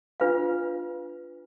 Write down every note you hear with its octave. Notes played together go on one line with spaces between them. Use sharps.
D4 F4 B4 F5